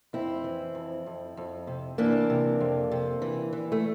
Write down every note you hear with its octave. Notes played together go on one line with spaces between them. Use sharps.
F2 C4 E4
E3
F2
F2
F2
C3
E3 A#3 D4
C3
F2
C3
E3
E3
A3